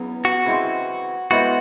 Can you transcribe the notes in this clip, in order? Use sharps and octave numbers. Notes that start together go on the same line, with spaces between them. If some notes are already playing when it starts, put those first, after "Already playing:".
Already playing: E2 C#3 F#3 B3
F#4
C#3 E3 G#3 C4
G#3 B3 E4 F#4 A4 C5